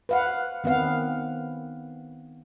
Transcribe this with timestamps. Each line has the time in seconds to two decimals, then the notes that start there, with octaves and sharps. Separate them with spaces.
0.09 B4 F5 F#5
0.64 D#3 B3 C4 F5 F#5